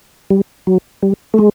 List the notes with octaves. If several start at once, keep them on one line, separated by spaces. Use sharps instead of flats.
G3
F#3
G3
A3
G#3